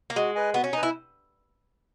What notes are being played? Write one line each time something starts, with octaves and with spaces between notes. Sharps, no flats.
A#3
G#3 F#4
B4 D#5 G#5
B3 F#4
C#4
D#4 B4 D#5 G#5
E4